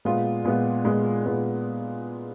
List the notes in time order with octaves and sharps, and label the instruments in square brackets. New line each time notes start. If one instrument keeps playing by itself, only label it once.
[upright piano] A#2 G#3 B3 F4
A#2 G#3 B3 F4
A#2 G#3 B3 F4
A#2 G#3 B3 F4